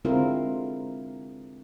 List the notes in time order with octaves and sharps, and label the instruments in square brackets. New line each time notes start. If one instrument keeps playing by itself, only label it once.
[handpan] D3 G#3 C4 E4 F4 A#4